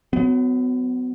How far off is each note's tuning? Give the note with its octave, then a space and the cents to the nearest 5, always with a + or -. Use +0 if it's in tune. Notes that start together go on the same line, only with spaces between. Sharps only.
F#3 +0 B3 +35